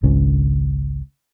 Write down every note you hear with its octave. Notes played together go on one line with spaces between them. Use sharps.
G#1 C#2 C#3